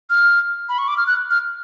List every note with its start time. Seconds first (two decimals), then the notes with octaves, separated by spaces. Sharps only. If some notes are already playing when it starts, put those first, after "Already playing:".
0.10 F6
0.69 B5
0.78 C#6
0.88 D6
0.97 F6
1.07 F#6
1.30 F6